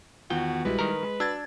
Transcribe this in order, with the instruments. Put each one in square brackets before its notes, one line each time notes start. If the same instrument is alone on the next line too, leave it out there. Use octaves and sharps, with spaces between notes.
[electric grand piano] E2 [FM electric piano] D#3 B3 F4 [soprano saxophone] F#4 [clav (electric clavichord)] G5
[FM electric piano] A#1 F#4 [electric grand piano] G3 G#3 E4 [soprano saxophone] B4
[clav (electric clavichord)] D#3 A#4 [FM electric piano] B5
[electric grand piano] G#3
[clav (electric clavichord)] D4 [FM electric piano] F#4 [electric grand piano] E6 G#6 A6